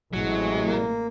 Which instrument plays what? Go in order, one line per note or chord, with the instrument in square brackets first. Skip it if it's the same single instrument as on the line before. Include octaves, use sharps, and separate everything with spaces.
[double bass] A1 A2 [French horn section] C3 G#3 E4 [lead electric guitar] F#3
[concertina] A#3